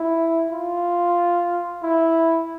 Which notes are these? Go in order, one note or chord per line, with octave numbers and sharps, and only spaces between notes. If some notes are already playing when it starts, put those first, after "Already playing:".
Already playing: E4
F4
E4